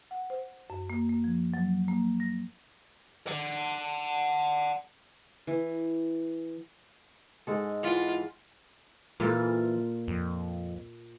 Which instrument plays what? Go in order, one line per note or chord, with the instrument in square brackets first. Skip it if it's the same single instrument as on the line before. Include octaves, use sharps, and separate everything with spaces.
[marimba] F#5
C5
F#2
A#3
A#3
F3
F#3
A#3
A#6
[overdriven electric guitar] D5 F#5
[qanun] E3
[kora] G#2 G#3 A4
[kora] E3 F#5 [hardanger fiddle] F4
[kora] A#2 F4 A4 [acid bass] E3
[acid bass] F2